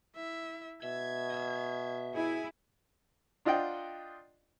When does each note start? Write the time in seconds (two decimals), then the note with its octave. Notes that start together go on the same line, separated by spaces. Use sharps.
0.16 E4 E5
0.83 B2 E5 G#6
1.30 D#5 E5
2.14 E4 G#4 G#5
3.45 D4 F4 D#5 F#5 G5